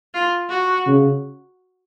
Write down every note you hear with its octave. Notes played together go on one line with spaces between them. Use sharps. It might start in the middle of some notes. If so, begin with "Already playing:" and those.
F4
F#4
C#3